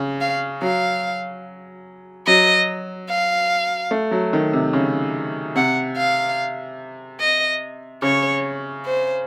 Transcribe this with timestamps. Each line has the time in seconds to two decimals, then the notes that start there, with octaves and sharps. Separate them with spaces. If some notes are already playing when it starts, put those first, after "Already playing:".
Already playing: C#3
0.21 F5
0.62 F#3 F5
2.27 F#3 D#5
3.09 F5
3.91 A3
4.11 F#3
4.33 D#3
4.53 C3
4.73 C#3
5.55 C3 F#5
5.97 F5
7.20 D#5
8.02 C#3 C#5
8.86 C5